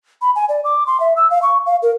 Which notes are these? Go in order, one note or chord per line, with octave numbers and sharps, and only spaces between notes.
B5
G#5
D5
D6
C6
E5
E6
F5
C#6
F5
A#4